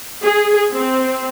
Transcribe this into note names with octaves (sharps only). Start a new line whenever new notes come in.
G#4
C4